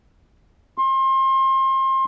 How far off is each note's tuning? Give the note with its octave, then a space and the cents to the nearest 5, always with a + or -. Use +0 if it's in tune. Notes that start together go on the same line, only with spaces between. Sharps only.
C6 +30